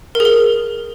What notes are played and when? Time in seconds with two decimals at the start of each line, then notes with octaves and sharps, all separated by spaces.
0.15 A#4
0.20 G#4
0.25 A#4